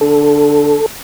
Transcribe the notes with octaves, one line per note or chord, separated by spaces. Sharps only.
D3 A4